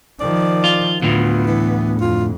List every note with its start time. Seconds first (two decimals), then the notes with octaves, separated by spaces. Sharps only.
0.20 D#3 F3 D5
0.64 F4
1.02 D2 A2 D3 B3 F4
1.47 E3
2.00 F2 F4